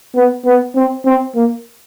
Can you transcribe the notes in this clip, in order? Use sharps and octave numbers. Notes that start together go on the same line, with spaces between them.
B3
B3
C4
C4
A#3